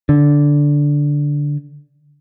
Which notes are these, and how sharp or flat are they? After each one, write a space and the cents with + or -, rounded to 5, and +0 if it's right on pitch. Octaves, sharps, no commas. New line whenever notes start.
D3 -10